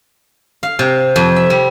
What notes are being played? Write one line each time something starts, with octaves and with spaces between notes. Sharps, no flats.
F5
C3
F2
E5
G3